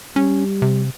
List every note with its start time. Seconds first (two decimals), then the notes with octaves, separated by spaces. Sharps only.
0.16 G3 C#4
0.62 C3